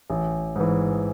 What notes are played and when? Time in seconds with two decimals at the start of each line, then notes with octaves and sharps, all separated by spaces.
0.10 A1
0.56 G#2 E3